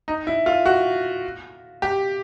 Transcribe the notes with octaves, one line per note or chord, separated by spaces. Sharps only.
D#4
E4
F4
F#4
G4